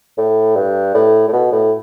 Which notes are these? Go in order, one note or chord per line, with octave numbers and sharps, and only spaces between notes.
A2
G2
A2
A2
B2
A2